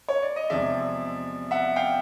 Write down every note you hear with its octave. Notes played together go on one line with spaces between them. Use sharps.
C#5
D5
D#5
E2 C3 F3 G#3 D5 E5
E5 F#5
F5 G5